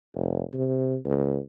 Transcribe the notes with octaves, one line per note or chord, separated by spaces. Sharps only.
F1
C3
C#2